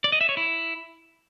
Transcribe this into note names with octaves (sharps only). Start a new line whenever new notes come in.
D5
D#5
E5
C#5
E4